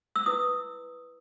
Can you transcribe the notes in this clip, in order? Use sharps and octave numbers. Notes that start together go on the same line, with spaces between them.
E6
E4 B4 D#6